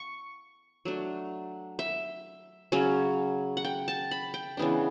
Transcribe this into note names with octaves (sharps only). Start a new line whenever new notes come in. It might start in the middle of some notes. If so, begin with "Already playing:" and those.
Already playing: C#6
F#3 A3 D4
E5
C#3 F#3 C#4
F#5
G5
A5
B5
G5
C#3 E3 B3 D4